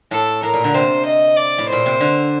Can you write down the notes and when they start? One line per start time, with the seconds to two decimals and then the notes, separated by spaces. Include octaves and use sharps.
0.11 A2 A4
0.43 A2 A#4
0.54 A#2
0.64 D3
0.74 C3 C5
1.06 D#5
1.37 D5
1.58 A2
1.69 A#2 C5
1.86 C3
2.00 D3